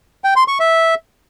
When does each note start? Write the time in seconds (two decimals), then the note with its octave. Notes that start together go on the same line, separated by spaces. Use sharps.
0.24 G5
0.36 C6
0.48 C#6
0.60 E5